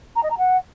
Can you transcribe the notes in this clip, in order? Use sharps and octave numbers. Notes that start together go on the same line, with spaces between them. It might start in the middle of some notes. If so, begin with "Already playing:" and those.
A#5
D#5
A#5
F#5